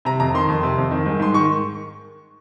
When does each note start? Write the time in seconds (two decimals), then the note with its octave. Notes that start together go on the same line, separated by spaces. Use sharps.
0.05 C3 A#5
0.20 F2 A#5
0.34 D#3 C6
0.49 F2
0.63 C3
0.78 F2
0.91 D#3
1.06 G#2
1.19 G#2 C6
1.34 D#3 C#6